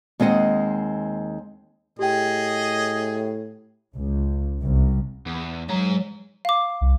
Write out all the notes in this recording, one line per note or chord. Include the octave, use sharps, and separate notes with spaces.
D#2 G#3 C4 D#5 F#5
A2 G4 G#4 D#5 G5
C#2
C2
E2
F#3 G#3 A#5
F5 D6
C2